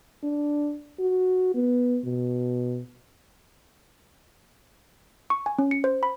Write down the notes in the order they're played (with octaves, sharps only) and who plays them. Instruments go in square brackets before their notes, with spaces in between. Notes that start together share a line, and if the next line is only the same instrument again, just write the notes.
[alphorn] D4
F#4
B3
B2
[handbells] C#6
G#5
C#4
C#7
C5
B5